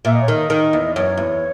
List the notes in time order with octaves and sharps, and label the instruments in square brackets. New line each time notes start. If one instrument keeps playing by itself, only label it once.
[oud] A#2 [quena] E5
[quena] D#5
C#5
[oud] D#3 [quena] D#5
[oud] D#3
E2
[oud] F#2 [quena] C#5
[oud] E2